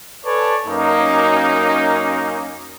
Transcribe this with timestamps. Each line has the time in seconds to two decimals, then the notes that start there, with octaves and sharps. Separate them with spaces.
0.25 A4 B4 C#5 D5 G#5 A5
0.67 F#2 A#3 C#4 D#4